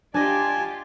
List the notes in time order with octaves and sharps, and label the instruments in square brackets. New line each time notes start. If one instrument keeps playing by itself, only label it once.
[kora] D4 D#5 [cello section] F4 G4 D5 [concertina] G#5 A5